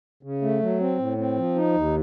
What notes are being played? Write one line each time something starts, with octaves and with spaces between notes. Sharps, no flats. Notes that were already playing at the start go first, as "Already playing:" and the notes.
C#3
A3
F#3
C4
A2
C4
F3
D#4
D#2